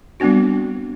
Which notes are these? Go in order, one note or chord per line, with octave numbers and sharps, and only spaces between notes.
G3 B3 C4 D4 F#4